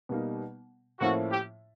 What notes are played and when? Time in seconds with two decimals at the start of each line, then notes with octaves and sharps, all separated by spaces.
0.09 B2 G3 A#3 D#4
1.00 A2 F3 A#3 C#4 E4 F#4
1.30 G4